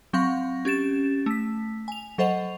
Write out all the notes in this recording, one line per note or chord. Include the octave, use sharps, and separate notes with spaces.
F#3 C4 F5 F#5 C#6 A#6
C#4 G4 A6 E7
A3 B6
G#5 F7
F#3 A4 C5 D#5 F#5 F7